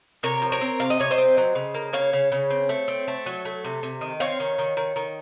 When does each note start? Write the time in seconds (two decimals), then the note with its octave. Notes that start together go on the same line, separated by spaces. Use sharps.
0.23 C3 A#4 C#5
0.42 F3
0.52 A#4 C#5
0.61 C4
0.80 C3 F5
0.90 D#5
0.99 C3 C#5
1.11 C5 D#5
1.18 C4
1.37 F#3
1.55 C#3
1.74 A#3
1.93 C#3 C#5 F5
2.13 C#3
2.32 C#3
2.50 C4
2.69 A3
2.88 C4
3.08 A3
3.26 F#3
3.45 A3
3.64 C3
3.83 C3
4.01 D#3
4.20 C4 C#5 F5
4.40 D#3
4.58 D#3
4.77 D#3
4.96 D#3